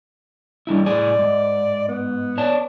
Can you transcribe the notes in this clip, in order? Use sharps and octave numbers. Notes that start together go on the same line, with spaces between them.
G3 D4 E4
A2 G#4 D5 G#5
G#2
B3
C#5 D5 A5